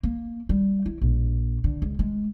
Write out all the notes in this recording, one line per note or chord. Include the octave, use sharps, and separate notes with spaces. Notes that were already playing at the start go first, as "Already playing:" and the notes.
A#3
G3
E4
A#1
D3
C#2
G#3